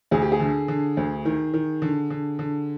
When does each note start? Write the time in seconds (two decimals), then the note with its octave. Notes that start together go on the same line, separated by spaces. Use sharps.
0.11 D2 G#4
0.22 G4
0.32 G#4
0.40 D3
0.68 D3
0.97 D2
1.25 D#3
1.54 D#3
1.82 D3
2.10 D3
2.39 D3